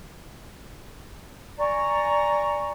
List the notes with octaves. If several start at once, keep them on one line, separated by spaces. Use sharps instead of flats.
D5 G#5 A#5 C#6